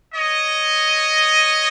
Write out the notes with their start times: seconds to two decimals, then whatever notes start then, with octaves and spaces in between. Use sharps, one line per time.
0.14 C#5 D#5